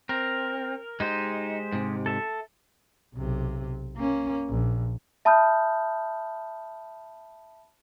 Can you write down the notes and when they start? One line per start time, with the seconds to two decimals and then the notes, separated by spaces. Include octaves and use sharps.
0.09 C4 A#4
1.00 G#3 D#4 G4 C5
1.72 G#2 C3
2.06 A4 E5
3.14 B1 C3
3.96 A#3 C#4
4.49 A#1
5.25 E5 A5 B5 D#6 F6 G6